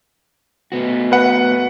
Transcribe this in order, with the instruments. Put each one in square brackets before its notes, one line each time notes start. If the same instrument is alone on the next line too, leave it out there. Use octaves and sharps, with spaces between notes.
[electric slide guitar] A3 B3 F#4
[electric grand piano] B4 F#5